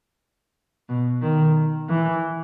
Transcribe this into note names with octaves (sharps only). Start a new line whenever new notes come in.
B2
D#3
E3